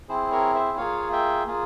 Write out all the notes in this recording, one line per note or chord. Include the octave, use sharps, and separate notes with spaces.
C4 E4 G#4 C5
A#4 C#5
C5 E5
A#3 F4 G#4 C#5 F5
E5 G5
A#3 F4 G#4